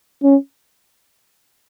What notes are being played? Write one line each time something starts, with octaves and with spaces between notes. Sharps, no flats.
C#4